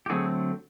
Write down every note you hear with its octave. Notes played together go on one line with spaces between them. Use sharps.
G4
D3 F#3 A3 C4 F#4 G#4